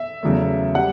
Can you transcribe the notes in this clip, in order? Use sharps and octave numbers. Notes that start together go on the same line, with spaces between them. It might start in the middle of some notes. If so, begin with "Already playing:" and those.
Already playing: E5
E2 C#3 F#3 A3
G3 F#5